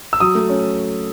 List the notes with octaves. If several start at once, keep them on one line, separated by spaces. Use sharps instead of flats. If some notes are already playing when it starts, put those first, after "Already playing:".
E6
F#3 D#6
A3
C#4